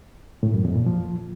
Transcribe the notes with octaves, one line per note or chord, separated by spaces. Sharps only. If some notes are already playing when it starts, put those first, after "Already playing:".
A2
F#2
F2
A#2
F3